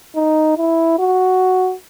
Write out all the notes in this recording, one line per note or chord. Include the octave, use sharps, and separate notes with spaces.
D#4
E4
F#4